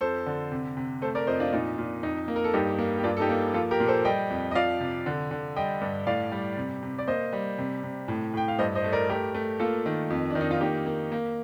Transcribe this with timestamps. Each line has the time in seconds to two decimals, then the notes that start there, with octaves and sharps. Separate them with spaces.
0.01 F2 A4 C5
0.26 D3
0.51 C3
0.77 C3
1.02 A3 A4 C5
1.15 A#4 D5
1.27 F2 C5 D#5
1.40 D4 F4
1.53 A#2 D#4
1.78 A#2
2.03 F2 D#4
2.28 A#3
2.36 A#4
2.44 A4
2.53 G2 D#4 G4
2.79 A#3
2.98 G4
3.03 G2 D4 F4
3.17 A4
3.20 D#4 G4
3.29 A#3
3.54 F3 F4 A4
3.71 G4 A#4
3.80 A#2
3.88 A4 C5
4.05 G3 D#5 G5
4.30 F2
4.51 D#5
4.55 F3 D5 F5
4.80 C3
5.06 D3
5.31 D3
5.56 G3 D#5 G5
5.81 G2
6.07 A2 D5 F5
6.32 G3
6.57 C3
6.83 C3
6.99 D5
7.08 A#3 C5 D#5
7.33 G3
7.58 C3
7.83 C3
8.08 A2
8.34 A2 G5
8.48 F5
8.59 G2 C5 D#5
8.75 C5 D#5
8.84 A3
8.92 A#4 D5
9.09 A3 G4 A#4
9.35 A3
9.59 A#3 F4 A4
9.86 D#3
10.10 F2
10.30 D#3 D4
10.41 D#4
10.51 F4
10.61 A#3 D#4 G4
10.86 A#3
11.12 A#3